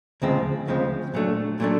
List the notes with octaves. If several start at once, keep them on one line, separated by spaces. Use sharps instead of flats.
D2 C#3 F3 G#3 C4
D2 C#3 F3 G#3 C4
A#2 F#3 A3 D4
A#2 F#3 A3 D4